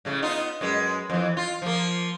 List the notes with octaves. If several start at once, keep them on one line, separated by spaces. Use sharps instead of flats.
A2 C#3 A3
B3 D#4 F4
F#2 G#3 B4
F2 E3
F4
F3 A#3